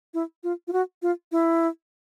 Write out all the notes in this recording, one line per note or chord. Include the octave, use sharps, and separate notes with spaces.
E4
F4
F4
F#4
F4
E4